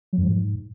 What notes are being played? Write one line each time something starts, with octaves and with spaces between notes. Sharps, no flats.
F#3
F#2
F3
G#2